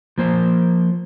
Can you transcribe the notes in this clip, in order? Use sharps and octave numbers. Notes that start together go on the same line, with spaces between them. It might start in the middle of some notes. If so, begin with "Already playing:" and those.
F3 A#3 C5